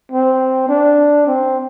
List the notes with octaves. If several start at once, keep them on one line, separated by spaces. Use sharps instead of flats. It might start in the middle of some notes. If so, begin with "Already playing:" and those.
C4
D4
C4